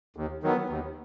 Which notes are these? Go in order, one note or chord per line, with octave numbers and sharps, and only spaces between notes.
D#2
D#3 F#3 B3
D#2